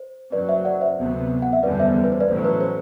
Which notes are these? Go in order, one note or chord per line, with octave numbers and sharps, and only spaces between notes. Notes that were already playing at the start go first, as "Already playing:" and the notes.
Already playing: C5
F#1 F#2 F#3 B4 D5
C5 E5
D5 F#5
C5 E5
D2 C3 F#3 B3
F#5
E5
F#1 E2 D3 G3 B4 D5
C5 E5
B4
C5
B4 D5
A1 A2 F#3 C5
B4
C5